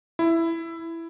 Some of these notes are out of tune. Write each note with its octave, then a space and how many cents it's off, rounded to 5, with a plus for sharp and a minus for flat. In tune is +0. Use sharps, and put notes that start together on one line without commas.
E4 +10